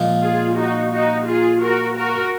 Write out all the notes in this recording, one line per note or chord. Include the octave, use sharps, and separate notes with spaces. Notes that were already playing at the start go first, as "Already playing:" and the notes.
Already playing: A#2 F3 G#3
F4 G#4
D#4 F#4
D#4 F#4
F4 G#4
F#4 A#4
F#4 A#4